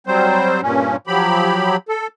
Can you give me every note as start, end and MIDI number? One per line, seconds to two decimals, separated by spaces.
0.07 0.61 54
0.07 0.61 55
0.07 0.61 60
0.07 0.61 72
0.62 0.96 43
0.62 0.96 46
0.62 0.96 61
1.07 1.77 53
1.07 1.77 54
1.07 1.77 67
1.07 1.77 83
1.89 2.07 69